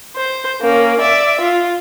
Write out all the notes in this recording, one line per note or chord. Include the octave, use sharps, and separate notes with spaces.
C5
A#3 C#4
D5 E5
F4